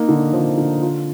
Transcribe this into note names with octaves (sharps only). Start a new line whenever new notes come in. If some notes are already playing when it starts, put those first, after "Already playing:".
Already playing: A#3 D#4
D3
F3
D3
F4